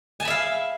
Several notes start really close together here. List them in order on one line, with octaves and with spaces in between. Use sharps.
G#5 A5 B5 E5 F5